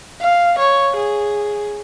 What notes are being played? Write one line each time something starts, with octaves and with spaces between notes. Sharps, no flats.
F5
C#5
G#4